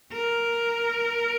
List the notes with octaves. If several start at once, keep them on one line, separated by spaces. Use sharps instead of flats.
A#4